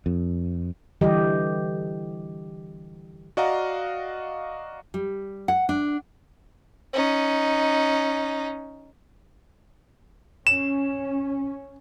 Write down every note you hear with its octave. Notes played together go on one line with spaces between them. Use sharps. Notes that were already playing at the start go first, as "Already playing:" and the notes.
F2
D3 E3 G3 G4 D#5
F#4 D5 D#5 F5 F#5 A#5
G3
F#5
D4
C#4 D#4
C#4 E7